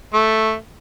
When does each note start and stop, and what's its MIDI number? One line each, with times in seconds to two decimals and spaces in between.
0.14 0.55 57